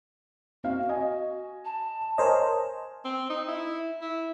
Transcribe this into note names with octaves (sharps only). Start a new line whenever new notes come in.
C4 F#4 F5
D#5 G#5
A5
A#4 C5 C#5 D#5 G#5
C4
D#4
E4
E4